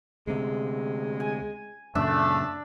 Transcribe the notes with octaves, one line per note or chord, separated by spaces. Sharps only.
D2 C3 G#3
G#5
F#2 A#2 C#3 A3 D4 E5